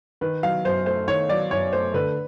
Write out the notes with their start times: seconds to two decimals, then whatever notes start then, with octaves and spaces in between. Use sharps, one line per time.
0.21 D#3 B4
0.43 F#3 F5
0.64 F#2 C5
0.86 A3 C5
1.08 D#3 C#5
1.29 F#3 D5
1.51 F#2 C#5
1.72 A3 C5
1.94 D3 B4